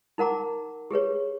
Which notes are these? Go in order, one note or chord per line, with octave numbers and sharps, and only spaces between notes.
D#4 A#4 F#5 A#5 D6
G4 G#4 B4 C#5